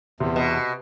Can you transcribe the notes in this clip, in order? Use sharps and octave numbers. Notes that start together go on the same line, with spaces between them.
E2 C3
B2